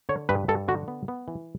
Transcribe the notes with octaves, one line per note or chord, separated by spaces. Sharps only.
D3 C#5
G2 B4
G2 A4
D3 F#4
B3
B3
E3